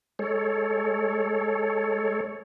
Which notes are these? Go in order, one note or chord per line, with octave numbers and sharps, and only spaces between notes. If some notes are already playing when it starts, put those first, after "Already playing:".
G#3 A4 C#5